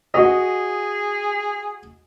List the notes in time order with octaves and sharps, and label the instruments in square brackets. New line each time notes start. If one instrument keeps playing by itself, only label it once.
[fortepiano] F#4 D#5 [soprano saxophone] G#4